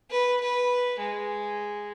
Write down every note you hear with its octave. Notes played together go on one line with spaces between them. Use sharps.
B4
B4
G#3